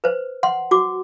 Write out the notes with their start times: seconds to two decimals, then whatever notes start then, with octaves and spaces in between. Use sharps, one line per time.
0.04 B4 C5
0.43 F#5 C6
0.71 F#4 D6